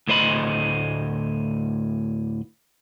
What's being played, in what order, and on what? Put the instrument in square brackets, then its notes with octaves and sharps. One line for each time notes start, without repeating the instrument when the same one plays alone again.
[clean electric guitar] D2 A2 C5 D#5 B5